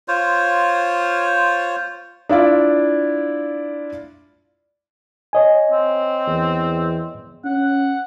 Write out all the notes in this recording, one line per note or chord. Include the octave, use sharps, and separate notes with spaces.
F4 C5 C#5
D4 E4 F4 D5
C#5 D#5 G#5
C4
E2
C#4 F#5